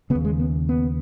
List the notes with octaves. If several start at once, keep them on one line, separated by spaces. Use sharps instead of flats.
C#3 B3
D#2
G#3
B3
B3